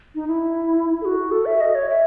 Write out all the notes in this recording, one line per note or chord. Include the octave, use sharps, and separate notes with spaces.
D#4
E4
A4
F#4
A4
E5
D#5
C#5
E5